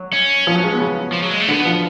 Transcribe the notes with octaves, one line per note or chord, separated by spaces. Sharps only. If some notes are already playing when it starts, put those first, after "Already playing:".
Already playing: F#3
C#4
F3
F#3
G#3
B3
C#3
F3
F#3
G#3
A3
D3 B3
F3